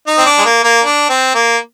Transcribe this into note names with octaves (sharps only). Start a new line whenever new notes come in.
D#4
C4
D4
G#3
A#3
A#3
D4
C4
A#3